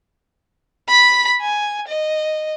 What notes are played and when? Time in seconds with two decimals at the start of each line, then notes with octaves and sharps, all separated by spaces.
0.88 B5 B6
1.41 G#5
1.88 D#5